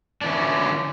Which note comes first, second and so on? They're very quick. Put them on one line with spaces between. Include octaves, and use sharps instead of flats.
D4 E3 C#4 F#3 D3